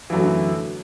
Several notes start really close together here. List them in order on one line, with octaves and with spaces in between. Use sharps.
E3 F#2 A3 F#3 D3